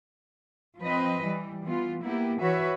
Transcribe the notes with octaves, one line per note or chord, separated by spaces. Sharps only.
F3 C4 B4 D#5
E3 G3
E3 B3 F4
A#3 B3 E4 G4
E3 F#4 B4 C#5 E5